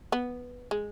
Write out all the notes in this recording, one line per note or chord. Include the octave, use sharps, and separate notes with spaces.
B3
G#3